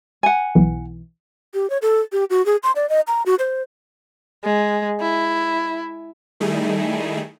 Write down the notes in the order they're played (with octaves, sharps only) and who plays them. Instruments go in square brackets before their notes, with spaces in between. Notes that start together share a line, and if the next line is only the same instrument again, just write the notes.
[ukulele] F#5 G#5
[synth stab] B1 E3
[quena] G4
C#5
A4
G4
F#4
G#4
C6
D5
D#5
A#5
F#4
C5
[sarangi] G#3
E4
[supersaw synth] D#3 G3 A3 D#4 E4 G#4